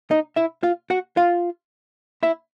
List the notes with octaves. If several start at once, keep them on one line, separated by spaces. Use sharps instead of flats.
D#4 D#5
E4 E5
F4 F5
F#4 F#5
F4 F5
E4 E5